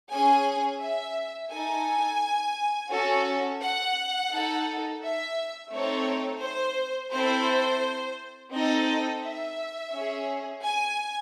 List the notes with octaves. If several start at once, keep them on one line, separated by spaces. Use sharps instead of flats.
C#4 G#4 G#5
E5
D#4 A4 G#5
C#4 F#4 A4
F#5
D#4 A4
E5
A3 C4 D#4 A4 C#5
C5
C4 E4 A4 C5
C4 D#4 A4 D#5
E5
C#4 G#4
G#5